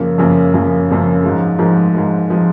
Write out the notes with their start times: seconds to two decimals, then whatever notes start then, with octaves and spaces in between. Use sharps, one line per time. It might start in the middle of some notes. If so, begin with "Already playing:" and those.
Already playing: F#2 C#3 F3 A#3
0.18 F#2 C#3 F3 A#3
0.54 F#2 C#3 F3 A#3
0.89 F#2 C#3 F3 A#3
1.24 G#2 F3 G#3
1.59 G#2 F3 G#3
1.94 G#2 F3 G#3
2.30 F3 G#3